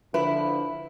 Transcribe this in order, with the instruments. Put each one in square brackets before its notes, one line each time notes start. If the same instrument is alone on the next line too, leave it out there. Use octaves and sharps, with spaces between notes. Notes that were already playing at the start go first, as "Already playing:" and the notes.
[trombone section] D3 F3 [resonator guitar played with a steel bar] E4 [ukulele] B4